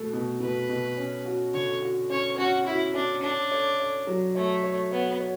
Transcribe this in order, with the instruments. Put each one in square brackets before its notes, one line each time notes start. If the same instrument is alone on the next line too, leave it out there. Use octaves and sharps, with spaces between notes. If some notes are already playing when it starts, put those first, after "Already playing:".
Already playing: [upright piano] B2 A3 A4
B2
[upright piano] B2 [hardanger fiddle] B4
[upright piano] B2
C#4
F#4
[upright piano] D3 [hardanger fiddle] C#5
[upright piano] F#4
[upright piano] C#4 [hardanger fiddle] C#5
[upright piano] C#4 [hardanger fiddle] F#4
[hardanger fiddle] E4 [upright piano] F#4
[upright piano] C#4 [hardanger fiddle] D4
[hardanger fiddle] D4 [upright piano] C#5
[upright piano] C#5
C#5
F#3
[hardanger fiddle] A3 [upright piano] C#5
[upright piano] C#5
[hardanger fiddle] B3 [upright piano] C#5
[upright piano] C#5